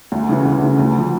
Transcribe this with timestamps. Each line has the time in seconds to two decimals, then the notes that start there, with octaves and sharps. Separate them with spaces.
0.12 D2
0.29 C#3 E3
0.45 D2
0.63 C#3 E3
0.79 D2
0.96 D3 F3